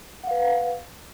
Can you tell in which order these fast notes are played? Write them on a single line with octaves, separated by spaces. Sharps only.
F#5 F5 B4